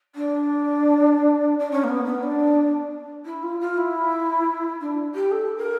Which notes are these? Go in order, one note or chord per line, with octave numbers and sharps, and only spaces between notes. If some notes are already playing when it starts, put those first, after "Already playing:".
D4
D4
C#4
A#3
B3
B3
D4
E4
F4
F4
E4
D4
G4
A4
A#4